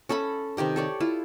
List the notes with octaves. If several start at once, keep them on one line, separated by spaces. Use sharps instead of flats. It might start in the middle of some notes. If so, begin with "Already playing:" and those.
C#4 A4 E5 B5
C3 D#3 G4 D#5
A4 C#5 D5
E4 F4